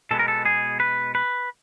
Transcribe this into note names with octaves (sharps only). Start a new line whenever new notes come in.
B2 G#3 B3 A4
A#4
A4
G#4
B4
B4